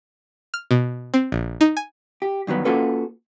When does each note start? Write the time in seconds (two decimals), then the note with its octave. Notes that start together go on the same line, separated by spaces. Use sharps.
0.54 F6
0.71 B2
1.14 C4
1.32 A#1
1.61 D#4
1.77 G#5
2.22 G4
2.47 G2 D#3 F#3 B3
2.65 A#3 C#4 F4 F#4 A4 B4